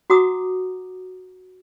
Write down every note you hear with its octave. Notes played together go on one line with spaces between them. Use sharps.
F#4 F#5 A#5 D6 D#6